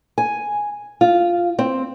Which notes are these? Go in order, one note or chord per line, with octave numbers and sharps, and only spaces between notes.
G#5
F4
C4